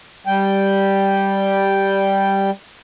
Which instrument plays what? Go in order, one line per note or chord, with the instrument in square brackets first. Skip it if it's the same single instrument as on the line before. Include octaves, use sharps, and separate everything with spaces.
[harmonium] G3 G5